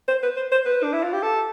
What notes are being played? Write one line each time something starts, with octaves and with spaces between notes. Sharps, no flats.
C5
B4
C5
C5
B4
D4
E4
F4
G4
A4